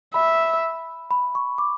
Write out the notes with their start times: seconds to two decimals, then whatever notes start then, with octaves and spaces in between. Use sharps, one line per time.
0.14 E5 B5
1.11 B5
1.35 C#6
1.58 D6